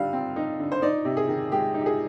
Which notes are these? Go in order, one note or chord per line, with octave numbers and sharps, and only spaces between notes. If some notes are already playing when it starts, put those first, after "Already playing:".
Already playing: D3 G3 D#4 F5
C4
D#4
D3
C5
D#4 D5
C3
G#4
D#3
G#3 G4
D#4
G4
G#4